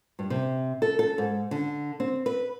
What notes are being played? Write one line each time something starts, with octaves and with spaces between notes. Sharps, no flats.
G2
C3
A4
A4
G#2
D3
C4
B4